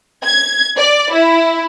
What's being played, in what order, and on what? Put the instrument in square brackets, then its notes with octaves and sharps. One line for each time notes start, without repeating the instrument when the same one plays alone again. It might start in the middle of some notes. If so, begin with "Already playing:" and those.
[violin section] G#6
D5
E4